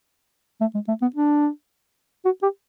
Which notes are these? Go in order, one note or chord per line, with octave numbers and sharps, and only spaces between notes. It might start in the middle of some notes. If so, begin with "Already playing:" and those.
A3
G#3
A3
B3
D4
F#4
G4